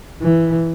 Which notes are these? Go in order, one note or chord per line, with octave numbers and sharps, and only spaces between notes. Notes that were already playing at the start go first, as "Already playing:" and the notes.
E3